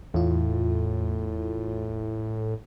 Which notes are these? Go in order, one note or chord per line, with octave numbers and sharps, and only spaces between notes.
E2 A2 F4